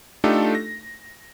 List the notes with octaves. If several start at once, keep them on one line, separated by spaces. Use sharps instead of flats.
A3 D4 D#4 F4 G4 A4
A#6